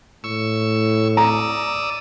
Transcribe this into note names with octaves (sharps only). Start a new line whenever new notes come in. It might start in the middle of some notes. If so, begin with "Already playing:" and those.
A2 C#6 E6
D5 A#5 D#6 E6